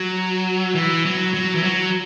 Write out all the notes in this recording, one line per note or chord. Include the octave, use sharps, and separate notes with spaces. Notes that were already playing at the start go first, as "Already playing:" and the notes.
Already playing: F#3
E3
F#3
F#3
E3
F#3